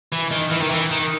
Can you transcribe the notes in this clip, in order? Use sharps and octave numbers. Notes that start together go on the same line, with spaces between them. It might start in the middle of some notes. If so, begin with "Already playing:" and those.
E3
D#3
E3
D#3
E3
D#3